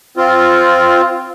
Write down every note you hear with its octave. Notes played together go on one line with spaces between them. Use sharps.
C4 F4